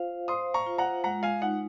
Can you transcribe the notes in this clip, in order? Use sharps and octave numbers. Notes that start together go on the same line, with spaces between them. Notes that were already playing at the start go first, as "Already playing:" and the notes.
Already playing: F4 C5 F5
C5 C6 D#6
A#5 C#6
F4
F#5 A#5
G#3 F#5 A#5
F5 G#5
D#4 F#5